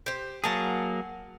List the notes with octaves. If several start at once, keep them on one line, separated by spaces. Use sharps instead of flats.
G4 C5
F#3 A#3 G#4 F#5 A5 A#5